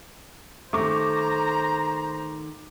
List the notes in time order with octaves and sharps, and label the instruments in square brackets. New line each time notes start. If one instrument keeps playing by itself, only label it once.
[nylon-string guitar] D#3 A3 [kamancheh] C5 A#5 [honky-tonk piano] C#6 D6